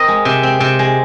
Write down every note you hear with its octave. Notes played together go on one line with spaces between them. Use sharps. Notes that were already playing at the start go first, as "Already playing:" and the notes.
Already playing: C4 A#4 D#5
G#3
C3
C4
C3
G#3